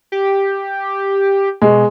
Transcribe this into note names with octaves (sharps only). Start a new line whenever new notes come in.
G4
B2 G#3